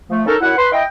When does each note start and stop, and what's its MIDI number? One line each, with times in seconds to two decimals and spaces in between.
0.10 0.22 53
0.10 0.22 57
0.26 0.35 61
0.26 0.35 63
0.26 0.35 69
0.26 0.35 70
0.41 0.53 42
0.41 0.53 64
0.41 0.53 78
0.57 0.71 71
0.57 0.71 84
0.72 0.83 64
0.72 0.83 75
0.72 0.83 79